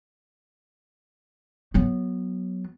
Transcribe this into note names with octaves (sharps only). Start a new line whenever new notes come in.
F#3 B3